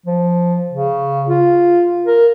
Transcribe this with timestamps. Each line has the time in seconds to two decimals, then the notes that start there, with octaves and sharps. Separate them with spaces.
0.06 F3
0.70 C#3
1.29 F4
2.06 A#4